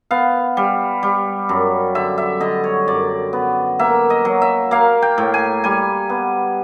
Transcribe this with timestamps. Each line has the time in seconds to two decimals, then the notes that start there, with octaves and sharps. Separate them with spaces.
0.11 B3 F5
0.57 G3
1.03 G3
1.49 F#2
1.95 D3 E5
2.18 E5
2.41 D3 D#5
2.64 C#5
2.88 F#2 D5
3.33 B3
3.79 A#3 E5
4.10 D#5
4.25 F#3
4.42 E5
4.71 A#3 F5
5.02 G5
5.18 A2
5.34 G#5
5.64 G3 G#5
6.09 B3